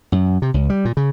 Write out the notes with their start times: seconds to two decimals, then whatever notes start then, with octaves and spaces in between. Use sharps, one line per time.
0.12 F#2
0.42 C3
0.54 C#2
0.70 G3
0.85 A#2
0.97 C#3